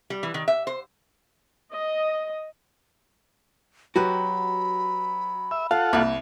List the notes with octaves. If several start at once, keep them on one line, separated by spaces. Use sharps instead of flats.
G3
E3
D#3
E5
C5
D#5
F#3 F#4 G4 B4 B5
E5
F4 A4 F5 F#5
C2 A#3 B5